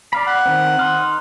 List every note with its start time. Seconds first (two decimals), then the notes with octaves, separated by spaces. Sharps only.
0.13 D5 F5 B5
0.27 F#5
0.46 D#3 C4
0.79 D#4 C6 F6